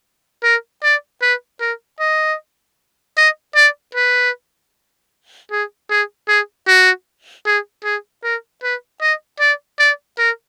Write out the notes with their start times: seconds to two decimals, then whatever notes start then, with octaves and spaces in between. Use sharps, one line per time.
0.44 A#4
0.84 D5
1.22 B4
1.61 A#4
2.00 D#5
3.17 D#5
3.56 D5
3.95 B4
5.52 G#4
5.90 G#4
6.28 G#4
6.68 F#4
7.46 G#4
7.84 G#4
8.24 A#4
8.63 B4
9.02 D#5
9.40 D5
9.79 D5
10.18 A#4